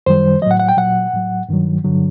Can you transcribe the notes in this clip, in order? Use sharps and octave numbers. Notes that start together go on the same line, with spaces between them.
F#2 D#3 G3 C5
A2 F#3 D#5 F#5
F#5
G5
A#2 F#3 F#5
A2 F#3
G2 D#3 F#3
G2 D3 F#3